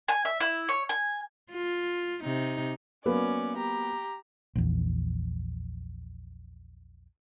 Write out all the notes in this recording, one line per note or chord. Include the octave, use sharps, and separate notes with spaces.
G#5
E5
E4
C#5
G#5
F4
C3 D#4
F#3 A#3 B3 C#4 D5
G4 A#5
A#1 E2